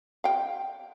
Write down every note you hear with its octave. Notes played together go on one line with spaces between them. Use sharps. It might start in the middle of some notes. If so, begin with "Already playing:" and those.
F5 G5